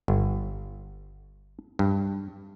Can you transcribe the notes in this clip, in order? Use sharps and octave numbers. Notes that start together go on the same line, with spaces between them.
G1
G2